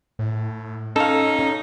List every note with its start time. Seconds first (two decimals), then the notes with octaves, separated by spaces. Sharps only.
0.19 A2
0.96 C#4 D#4 A4 F5